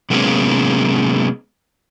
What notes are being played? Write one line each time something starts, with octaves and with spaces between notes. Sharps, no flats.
C3 F#3 G#3 A#3 B3 C#4